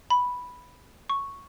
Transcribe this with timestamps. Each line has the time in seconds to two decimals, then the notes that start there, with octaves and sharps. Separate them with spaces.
0.10 B5
1.10 C#6